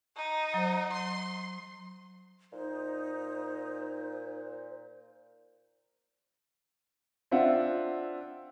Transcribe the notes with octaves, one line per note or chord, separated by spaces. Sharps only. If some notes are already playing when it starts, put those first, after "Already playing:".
D#4
F#3 C5
C6
A#2 D#4 C5 A#5
C4 D4 F4 E5 F#5